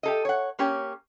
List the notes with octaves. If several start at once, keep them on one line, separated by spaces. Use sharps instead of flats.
G4 A4 D#5
C#5 F#5
A#3 C#4 G4 C#5